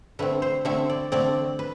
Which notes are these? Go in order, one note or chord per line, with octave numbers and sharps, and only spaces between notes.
D3 A3 C4 B4
C5
D3 A3 C4 E5
D5
D3 A3 C4 D5
B4